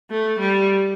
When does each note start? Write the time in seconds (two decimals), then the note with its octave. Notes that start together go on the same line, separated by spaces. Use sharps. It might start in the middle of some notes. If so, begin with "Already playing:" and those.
0.10 A3
0.39 G3